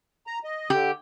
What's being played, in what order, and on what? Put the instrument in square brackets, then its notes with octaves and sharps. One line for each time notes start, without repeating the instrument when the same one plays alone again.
[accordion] A#5
D#5
[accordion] D3 [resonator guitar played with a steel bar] G4